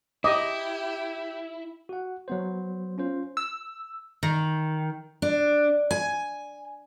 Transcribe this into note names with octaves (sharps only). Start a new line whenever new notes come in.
E4 G4 D#5 D6
F#4 F#5
F#3 B3 C5
C#4 F4 C5
E6
D#3
D4
G#5